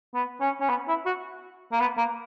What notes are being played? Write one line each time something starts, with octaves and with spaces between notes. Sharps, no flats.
B3
C#4
C#4
B3
E4
F#4
A#3
B3
A#3